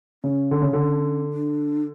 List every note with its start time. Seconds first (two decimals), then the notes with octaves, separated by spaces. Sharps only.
0.24 C#3 C#4
0.51 D3
0.62 C#3
0.73 D3
1.33 D4